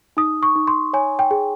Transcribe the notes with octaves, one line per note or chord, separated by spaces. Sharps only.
D#4 D#6
C#6
D#4
C6
C#5 G#5
G5
G#4